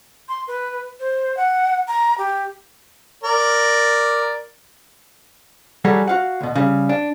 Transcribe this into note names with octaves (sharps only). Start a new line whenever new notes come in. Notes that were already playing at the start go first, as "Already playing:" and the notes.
C6
B4
C5
F#5
A#5
G4
A#4 D5
F#3 G3 F#4 G#4 A4
F#4 F5 F#5
D2 B2
C#3 G3
D4